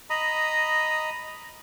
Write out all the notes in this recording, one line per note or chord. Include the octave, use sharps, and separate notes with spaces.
D#5 A#5 B5 D#6